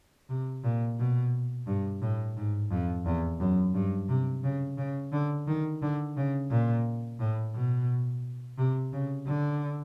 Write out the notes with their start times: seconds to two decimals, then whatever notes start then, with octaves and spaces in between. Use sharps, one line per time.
0.29 C3
0.64 A#2
0.99 B2
1.67 G2
2.02 A2
2.37 G#2
2.71 F2
3.06 E2
3.40 F#2
3.74 G2
4.09 C3
4.44 C#3
4.78 C#3
5.13 D3
5.48 D#3
5.82 D3
6.17 C#3
6.51 A#2
7.20 A2
7.55 B2
8.58 C3
8.93 C#3
9.27 D3